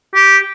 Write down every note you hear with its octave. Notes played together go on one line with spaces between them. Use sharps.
G4